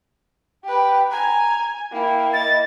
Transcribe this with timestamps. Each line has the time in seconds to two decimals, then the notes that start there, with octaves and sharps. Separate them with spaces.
0.64 G4 B4 G5
1.11 G#5 A#5
1.92 A#3 E4 G5
2.33 D#5 A6